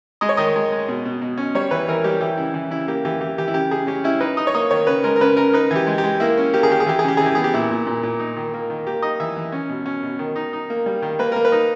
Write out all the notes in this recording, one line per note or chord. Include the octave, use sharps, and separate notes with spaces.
G#3 D#5
C#5
D#3 D#5
G#3
G#3
B2
B2
B2
C#4
G3 C#5
E3 B4
E3 A#4
G3 G4
E3 G4
C#3 E4
E3
C#3 E4
A#3 G4
E3 G4
E3 G4
E3 G4
E4
C#3 G4
C#3 G#4
C#4 G4
C#4 E4
D#4 B4
D#4 D#5
C#5
A#3 D#5
D#3 C#5
C#3 B4
G#3 A#4
A#4
C#3 B4
C#3 A#4
D#4 B4
E3 G4
G#3
G4
G#3
A#3 E4
C#4
A#3 G4
G#4
D#3 G4
G#4
E3 G4
G#4
C#3 G4
E3 G#4
G4
B3 G#4
G4
A#2 E4
A#2
A#2
A#2
D#4
D#3
A#3
D#3
A#3 G4
D#4 D#5
E3 E5
E3
C#4
B2
C#4
B2
D#3
D#4
D#4
A#3
G3
D#3
A#3 B4
A#3 A#4
B4
D#4